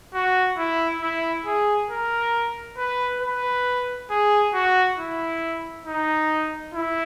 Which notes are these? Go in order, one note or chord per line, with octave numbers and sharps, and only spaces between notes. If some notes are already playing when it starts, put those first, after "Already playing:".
F#4
E4
E4
G#4
A#4
B4
B4
G#4
F#4
E4
D#4
E4